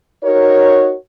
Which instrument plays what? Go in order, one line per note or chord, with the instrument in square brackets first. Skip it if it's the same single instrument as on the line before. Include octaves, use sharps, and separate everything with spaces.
[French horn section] D#4 F#4 A#4 C#5